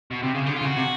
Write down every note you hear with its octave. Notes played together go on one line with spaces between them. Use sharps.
B2
C3
C#3
D3 G4
F4
C#3
F#4
C3